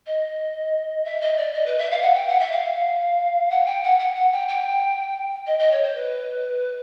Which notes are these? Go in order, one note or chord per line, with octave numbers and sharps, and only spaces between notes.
D#5
E5
D#5
D5
D#5
B4
E5
F5
F#5
G5
F#5
E5
F5
F#5
G5
F#5
F#5
F#5
G5
G5
D#5
D#5
C#5
C5
B4